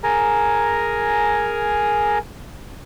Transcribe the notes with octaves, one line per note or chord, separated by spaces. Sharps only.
G#4 A#4 G#5 A#5